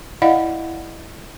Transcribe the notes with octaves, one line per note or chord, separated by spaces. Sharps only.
E4 D5 D#5 F5 F#5